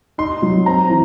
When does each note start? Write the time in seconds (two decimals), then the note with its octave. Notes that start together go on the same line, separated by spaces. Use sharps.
0.18 D#4 C6
0.42 F#3
0.66 C4 A#5
0.89 E3